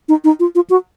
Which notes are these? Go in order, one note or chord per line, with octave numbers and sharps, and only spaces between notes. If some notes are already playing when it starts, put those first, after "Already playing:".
D#4
D#4
F4
F4
F#4